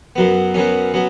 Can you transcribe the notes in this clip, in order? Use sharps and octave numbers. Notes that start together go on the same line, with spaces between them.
F#2 F#3 B3
F#2 F#3 B3 C#4
F#3 B3